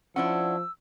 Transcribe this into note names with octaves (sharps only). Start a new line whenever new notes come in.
F3 C#4 D4 E4 F#5 E6